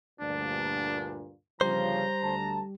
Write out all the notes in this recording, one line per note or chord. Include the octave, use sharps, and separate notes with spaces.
D2 G2 A#2 D4
G1 C#3 F3 G3 G4 C5 A#5
D2 A5